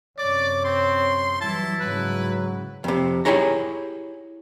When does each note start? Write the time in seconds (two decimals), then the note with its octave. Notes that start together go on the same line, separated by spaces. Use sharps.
0.18 F#2 C3 C#5 D5 D6
0.64 C4 C6
1.41 E3 F#3 G3 E4 A5
1.80 G#2 C#3 F#3 B4
2.84 F2 C3
3.25 E4 G4 G#4 C#5 A#5